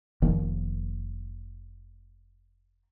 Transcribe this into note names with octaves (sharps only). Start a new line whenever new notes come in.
F1 D#3 F3 A#3